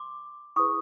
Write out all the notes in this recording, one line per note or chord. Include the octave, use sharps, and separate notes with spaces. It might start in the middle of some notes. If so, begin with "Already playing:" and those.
Already playing: C6 D6
E4 G#4 B4 C#6 D#6